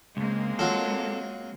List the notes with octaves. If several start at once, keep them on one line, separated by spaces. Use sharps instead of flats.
C#2 G#3 A#3 C4
F#3 F4 A4